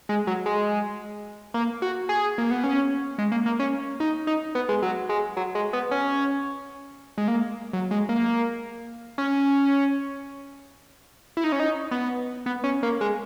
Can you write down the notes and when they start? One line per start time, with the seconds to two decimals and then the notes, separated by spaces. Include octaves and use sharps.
0.09 G#3
0.27 F#3
0.46 G#3
1.54 A#3
1.82 F#4
2.09 G#4
2.38 A#3
2.51 B3
2.64 C#4
3.18 G#3
3.32 A#3
3.46 A#3
3.59 C#4
4.00 D#4
4.27 D#4
4.55 B3
4.69 G#3
4.82 F#3
5.09 G#3
5.37 F#3
5.55 G#3
5.73 B3
5.91 C#4
7.18 G#3
7.28 A#3
7.73 F#3
7.91 G#3
8.09 A#3
9.18 C#4
11.37 E4
11.44 D#4
11.52 C#4
11.60 D#4
11.91 B3
12.46 B3
12.64 C#4
12.83 A#3
13.01 G#3